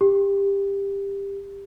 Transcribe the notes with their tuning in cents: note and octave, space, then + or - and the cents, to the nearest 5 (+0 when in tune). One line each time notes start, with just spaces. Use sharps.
G4 +20